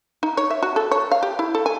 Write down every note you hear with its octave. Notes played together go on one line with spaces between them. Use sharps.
D#4
C#5
E5
F#4
A4
C#5
F5
G4
E4
A4
G#5